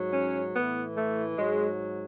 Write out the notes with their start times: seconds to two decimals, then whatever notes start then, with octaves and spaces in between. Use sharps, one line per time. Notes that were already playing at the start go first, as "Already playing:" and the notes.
Already playing: G#2 F#3
0.13 C#4
0.54 A2 E3 B3
0.96 A3
1.37 G#2 F#3 G#3